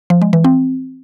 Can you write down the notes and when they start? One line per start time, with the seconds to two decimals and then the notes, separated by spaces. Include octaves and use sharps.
0.10 F3
0.22 G#3
0.33 E3
0.44 C4